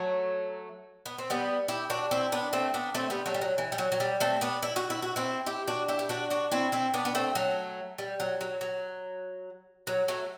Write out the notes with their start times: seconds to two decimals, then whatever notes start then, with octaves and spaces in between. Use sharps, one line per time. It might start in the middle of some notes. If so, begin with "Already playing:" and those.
Already playing: F#3 A3
1.06 B3
1.18 C4
1.30 G3 B3
1.68 E4 G4
1.90 D4 F#4
2.11 C4 E4
2.32 B3 D4
2.53 A3 C4
2.74 B3 D4
2.95 A3 C4
3.10 G3 B3
3.26 F#3 A3
3.34 G3
3.41 F#3
3.58 E3
3.72 G3
3.78 F#3
3.92 F#3
4.00 G3
4.20 A3 C4
4.41 B3 D4
4.62 E4
4.76 F#4
4.90 E4
5.02 F#4
5.16 C4 E4
5.46 E4 G4
5.68 D4 F#4
5.88 E4 G4
5.99 G4
6.09 D4 F#4
6.30 D4 F#4
6.51 C4 E4
6.72 C4 E4
6.94 B3 D4
7.05 B3
7.15 A3 C4
7.35 F#3 A3
7.98 G3
8.20 F#3
8.41 F#3
8.61 F#3
9.87 F#3
10.08 F#3 A3